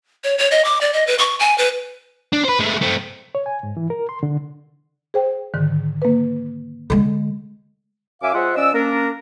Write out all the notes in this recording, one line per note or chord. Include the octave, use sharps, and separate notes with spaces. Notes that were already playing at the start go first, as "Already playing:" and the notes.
C#5
C#5
D#5
D6
D5
D#5
B4
C#6
G#5
B4
D4
B4 C5
G#3 A3
A3 C4
C#5
G#5
G#2
E3
A#4
C6
D3
G#4 C5 G5
G#2 D3 D#3
A#3 B4
D3 G#3 A4
F#2 E5 F5 G#5 D6
G#3 F4 C5 D#5 E5 F#5
F3 C#4 D5 D#5 E6
A#3 C#4 D4 A#4